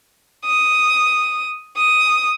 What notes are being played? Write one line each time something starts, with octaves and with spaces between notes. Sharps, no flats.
D#6
D#6